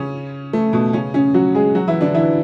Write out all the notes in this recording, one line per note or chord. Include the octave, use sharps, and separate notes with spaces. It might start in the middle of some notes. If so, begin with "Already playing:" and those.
Already playing: C#3 C#4
A3
B2 B3
C#3 C#4
C#3 C#4
F#3 F#4
G#3 G#4
F#3 F#4
E3 E4
D3 D4
E3 E4